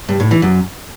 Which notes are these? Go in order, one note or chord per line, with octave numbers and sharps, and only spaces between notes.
G2
A2
E3
F#2